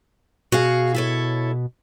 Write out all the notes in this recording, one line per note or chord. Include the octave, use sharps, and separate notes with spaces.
B2 F#4 G#4 F5
E4 A4 C#5